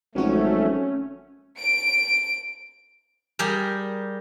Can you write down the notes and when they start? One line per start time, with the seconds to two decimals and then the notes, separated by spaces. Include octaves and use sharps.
0.15 G#1 F3 F#3 A3 C#4 F#4
1.60 D7
3.39 G3 G4 G#4 A#4